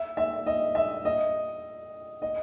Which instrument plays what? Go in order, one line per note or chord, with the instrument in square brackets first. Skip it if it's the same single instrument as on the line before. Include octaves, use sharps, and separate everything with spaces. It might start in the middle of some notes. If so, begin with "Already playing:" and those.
Already playing: [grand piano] E5
E5
D#5
E5
D#5
D#5